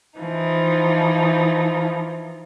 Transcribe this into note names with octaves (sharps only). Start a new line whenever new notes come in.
E3 F3 D#4